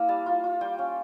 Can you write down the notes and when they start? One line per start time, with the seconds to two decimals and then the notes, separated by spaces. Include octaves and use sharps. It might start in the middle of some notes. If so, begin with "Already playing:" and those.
Already playing: A#3 E4 F5
0.09 G3 A5
0.26 F4
0.44 F4
0.61 G3 G5
0.79 C#4